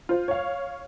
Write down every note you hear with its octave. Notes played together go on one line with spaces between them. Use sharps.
F4 C5
C#5 F5